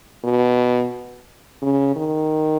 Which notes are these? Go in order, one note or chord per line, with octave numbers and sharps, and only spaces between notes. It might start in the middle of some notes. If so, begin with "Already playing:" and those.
B2
C#3
D#3